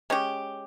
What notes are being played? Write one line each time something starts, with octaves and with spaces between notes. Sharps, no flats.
G#3 C#4 G4